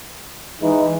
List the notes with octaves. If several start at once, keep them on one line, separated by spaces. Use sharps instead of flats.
E3 G#3 D#4